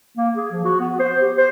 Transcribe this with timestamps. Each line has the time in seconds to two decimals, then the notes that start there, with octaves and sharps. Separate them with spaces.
0.17 A#3
0.36 G#4
0.52 F3
0.65 F#4
0.80 B3
0.99 C5
1.21 G4
1.37 C5